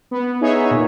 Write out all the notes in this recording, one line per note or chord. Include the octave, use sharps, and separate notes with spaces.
B3
D#4 G#4 C#5 E5
A#2